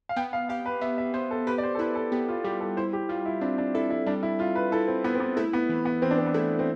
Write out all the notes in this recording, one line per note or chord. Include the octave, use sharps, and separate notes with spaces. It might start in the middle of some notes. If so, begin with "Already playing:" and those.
F5
B3 G5
F5
G4 F5
B4
B3 E5
E5
B3 C5
A4
G4 B4
D5
C5
A4
E4 B4
A4
B3 G4
F4
G3 G4
A4
E4 C5
G4
G3 F4
E4
C4 D4
D4
E4 A4
E4
G3 D4
E4
G3 F4
B4
E4 A4
C4
B3 E4
C4
B3
A3 E4
B3
E3
B3
E3 C4
D4
C4
B3
A3 E4
C4